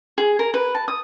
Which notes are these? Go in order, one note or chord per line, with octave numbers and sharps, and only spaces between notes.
G#4
A#4
B4
A5
D#6